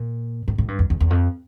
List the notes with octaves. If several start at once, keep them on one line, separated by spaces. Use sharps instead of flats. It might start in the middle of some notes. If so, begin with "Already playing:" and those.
Already playing: A#2
A2
A2
G2
F2
E2
E2
F2